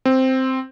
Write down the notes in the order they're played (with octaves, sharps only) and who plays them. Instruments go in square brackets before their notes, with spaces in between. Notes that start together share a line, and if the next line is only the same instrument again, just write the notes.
[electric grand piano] C4